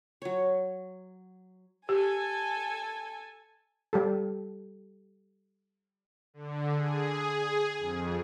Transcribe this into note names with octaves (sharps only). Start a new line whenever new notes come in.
F#3 C#5
G4 A4 G#5
G3 G4 A4
D3
G#4
G#4
F2